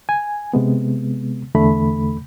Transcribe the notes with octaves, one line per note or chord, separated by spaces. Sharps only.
G#5
C3 G#3 B3
E2 D3 A3 B5